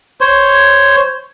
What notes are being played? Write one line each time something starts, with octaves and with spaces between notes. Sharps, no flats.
C5 C#5